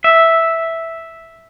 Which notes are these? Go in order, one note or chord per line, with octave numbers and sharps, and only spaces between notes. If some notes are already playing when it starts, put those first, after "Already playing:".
E5